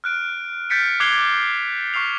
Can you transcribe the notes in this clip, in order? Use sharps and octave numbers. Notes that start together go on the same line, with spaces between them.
F6 F#6 D7
F6 G6 A6 B6 C#7 D7
D6 F#6 G#6 C7 F7 G7
C#6 D6 F6 C7 F7